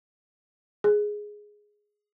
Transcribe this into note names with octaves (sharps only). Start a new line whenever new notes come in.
G#4